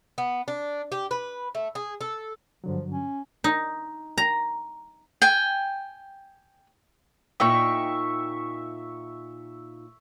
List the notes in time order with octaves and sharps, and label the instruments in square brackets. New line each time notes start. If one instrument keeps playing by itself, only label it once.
[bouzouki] B3
D4
G4
B4
A3
G#4
A4
[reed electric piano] G2 D3 F#3 [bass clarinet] F3
[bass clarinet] C#4
[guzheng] D#4
A#5
[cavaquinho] G5 G#5
[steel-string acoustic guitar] A#2 D#4 G5 [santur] E5 C#6